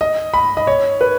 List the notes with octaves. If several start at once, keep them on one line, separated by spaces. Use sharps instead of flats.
D#5
B5
D#5
C#5
B4